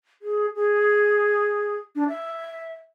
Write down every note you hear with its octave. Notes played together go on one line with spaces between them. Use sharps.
G#4
G#4
D4
E5